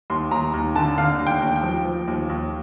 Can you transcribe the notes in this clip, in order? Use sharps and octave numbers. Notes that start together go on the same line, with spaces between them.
D#2 C6
D#2 A#5
D#2
D3 A5
D3 F5
D#2
G5
D#2
G5
F3
F3
D#2
D#2